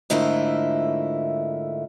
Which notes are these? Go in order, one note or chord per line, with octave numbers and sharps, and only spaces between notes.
G#2 D3 A3 E4 F4 A#4